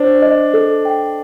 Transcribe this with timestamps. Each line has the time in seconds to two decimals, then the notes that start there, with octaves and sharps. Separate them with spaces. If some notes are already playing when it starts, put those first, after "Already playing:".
Already playing: D4 C5
0.22 D#5
0.54 A4
0.85 G5